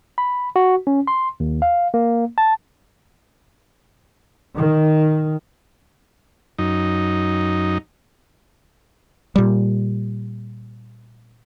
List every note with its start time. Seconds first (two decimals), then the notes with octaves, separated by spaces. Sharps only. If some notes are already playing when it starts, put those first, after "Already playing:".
0.18 B5
0.56 F#4
0.87 C#4
1.07 C6
1.40 D#2
1.62 F5
1.94 A#3
2.38 A5
4.57 D#3
6.58 F#2 D#4
9.36 A#2 G3